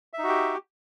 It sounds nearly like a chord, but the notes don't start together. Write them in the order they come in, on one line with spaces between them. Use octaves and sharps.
E5 D#4 F#4 G4